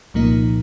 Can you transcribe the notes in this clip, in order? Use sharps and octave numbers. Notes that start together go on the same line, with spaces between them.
C2 A#2 F3 A#3 D#4